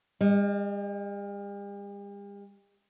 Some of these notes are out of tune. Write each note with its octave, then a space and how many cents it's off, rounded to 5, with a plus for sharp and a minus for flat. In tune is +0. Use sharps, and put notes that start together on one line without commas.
G3 +45 D#5 +0